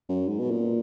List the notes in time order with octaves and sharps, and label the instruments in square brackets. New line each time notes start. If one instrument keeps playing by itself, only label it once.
[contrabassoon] F#2
G#2
B2
A#2